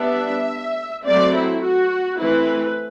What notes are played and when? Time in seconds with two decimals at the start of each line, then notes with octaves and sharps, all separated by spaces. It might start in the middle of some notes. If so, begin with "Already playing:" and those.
Already playing: G3 B3 D4 E5
1.05 F#3 A3 C4 D5
1.34 E4
1.62 F#4
2.19 E3 A3 C4 E4 B4